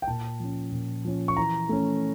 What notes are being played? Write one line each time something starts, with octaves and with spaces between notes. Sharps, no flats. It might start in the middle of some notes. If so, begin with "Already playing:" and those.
G5
A#2 A5
F3 C#4
A#2
F3 C#4
C#6
E3 A#5
A3 C#4